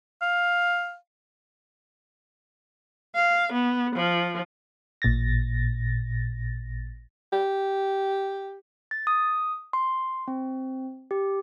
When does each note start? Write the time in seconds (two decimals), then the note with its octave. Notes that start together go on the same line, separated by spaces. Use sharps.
0.22 F5
3.15 F5
3.52 B3
3.95 F3
5.02 A1 A#2 A6 A#6
7.33 G4
8.91 A6
9.07 D#6
9.73 C6
10.28 C4
11.11 G4